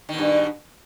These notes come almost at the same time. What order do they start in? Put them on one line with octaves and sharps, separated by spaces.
D#3 B2 G2